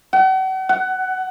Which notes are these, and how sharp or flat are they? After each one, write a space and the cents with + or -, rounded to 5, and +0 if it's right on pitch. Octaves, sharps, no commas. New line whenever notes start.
F#5 +40
F#5 +15